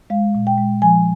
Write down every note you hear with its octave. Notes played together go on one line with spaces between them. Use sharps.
G#3 F5
A#2
G5
G#3
F3 G#5